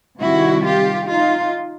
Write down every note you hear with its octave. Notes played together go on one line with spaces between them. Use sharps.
C3 D#3 G3 E4 F#4
F4 G4
D#4 F4